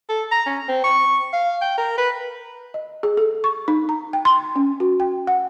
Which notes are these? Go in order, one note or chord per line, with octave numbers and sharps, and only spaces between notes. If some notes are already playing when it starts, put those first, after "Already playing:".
A4
A#5
C#4
C4
C#6
F5
G5
A#4
B4
D#5
G#4
A4
C#6
D#4
A#5
G5
C6
C#4
F#4
G5
F#5